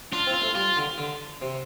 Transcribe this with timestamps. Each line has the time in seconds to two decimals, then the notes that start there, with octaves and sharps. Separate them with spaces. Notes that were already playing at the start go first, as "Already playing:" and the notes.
0.13 D4 F4
0.27 C4
0.34 F4
0.41 A3
0.55 G3 F4
0.77 D3
0.98 D3
1.42 C3